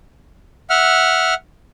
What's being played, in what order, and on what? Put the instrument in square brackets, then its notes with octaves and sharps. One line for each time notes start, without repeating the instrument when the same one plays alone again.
[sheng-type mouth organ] E5 F#5 F6